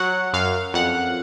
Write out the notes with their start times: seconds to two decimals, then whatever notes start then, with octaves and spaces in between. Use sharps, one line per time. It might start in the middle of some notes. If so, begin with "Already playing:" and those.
Already playing: F#3 F#5
0.33 F#2 F5
0.74 F2 F#5